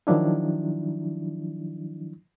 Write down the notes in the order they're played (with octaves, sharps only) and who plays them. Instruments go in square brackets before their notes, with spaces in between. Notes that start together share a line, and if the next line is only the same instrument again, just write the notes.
[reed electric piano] D#3 F3 F#3 D4 E4